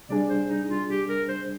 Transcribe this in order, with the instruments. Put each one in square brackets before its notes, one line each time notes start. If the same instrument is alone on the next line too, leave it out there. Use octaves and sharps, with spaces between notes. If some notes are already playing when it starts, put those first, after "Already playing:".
[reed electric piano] C3 G3 D4 G#4 [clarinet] D5
[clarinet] C5
D#4
F4
G4
A#4
C5